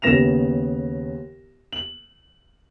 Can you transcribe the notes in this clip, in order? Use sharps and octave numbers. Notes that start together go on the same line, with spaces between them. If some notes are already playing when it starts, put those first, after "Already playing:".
D#2 C#3 B3 A#6 E7 F7
F#7